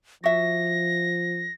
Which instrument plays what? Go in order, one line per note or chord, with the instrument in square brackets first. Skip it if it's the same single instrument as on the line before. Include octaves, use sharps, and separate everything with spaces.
[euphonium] F3 [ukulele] F#4 E5 [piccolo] A#6